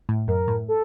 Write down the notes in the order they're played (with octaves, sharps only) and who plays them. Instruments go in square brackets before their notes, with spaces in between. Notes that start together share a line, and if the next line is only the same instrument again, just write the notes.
[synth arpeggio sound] A2
[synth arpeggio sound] F#2 [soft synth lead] A#4
[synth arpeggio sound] A2
[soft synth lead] A4